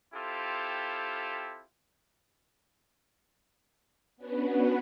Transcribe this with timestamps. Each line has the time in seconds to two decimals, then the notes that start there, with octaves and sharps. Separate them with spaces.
0.14 C4 E4 F4 G4 A4
4.17 B3 C#4 D4 F#4 B4